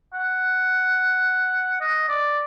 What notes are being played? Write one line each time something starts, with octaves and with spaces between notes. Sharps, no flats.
F#5
D#5
D5